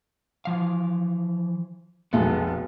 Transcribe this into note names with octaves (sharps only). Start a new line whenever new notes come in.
E3 F3 F5
F1 B1 G#3 B3 A4